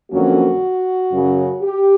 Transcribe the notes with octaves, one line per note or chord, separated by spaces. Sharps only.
F2 D3 F#3 A#3 C#4 F#4
F#2 C#3 F#3
G4